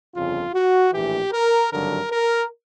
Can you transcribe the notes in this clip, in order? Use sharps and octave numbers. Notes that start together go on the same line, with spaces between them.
G1 F2 C#3 F4
F#4
A#1 A2 E3 G4
A#4
G#1 G2 D3 F#3 A#4
A#4